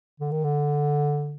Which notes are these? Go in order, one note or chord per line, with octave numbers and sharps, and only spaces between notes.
D3
D#3
D3